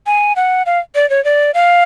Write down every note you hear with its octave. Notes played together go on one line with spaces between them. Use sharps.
G#5
F#5
F5
D5
C#5
D5
F5